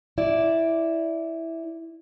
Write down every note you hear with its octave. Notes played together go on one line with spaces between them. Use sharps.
E4 D5